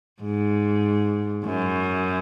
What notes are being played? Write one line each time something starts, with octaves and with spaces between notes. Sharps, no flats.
G#2
F#2